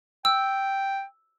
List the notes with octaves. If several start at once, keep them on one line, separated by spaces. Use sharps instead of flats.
G5 E6